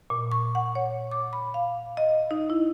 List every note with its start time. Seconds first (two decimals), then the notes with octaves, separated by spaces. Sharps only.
0.10 A#2
0.32 C#6
0.55 F#5
0.75 C#5
1.11 D6
1.33 B5
1.54 F5
1.97 D#5
2.31 D#4
2.50 E4